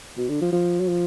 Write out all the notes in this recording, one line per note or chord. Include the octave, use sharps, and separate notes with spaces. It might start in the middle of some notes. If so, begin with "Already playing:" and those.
B2
D3
F3
F3
F#3
F3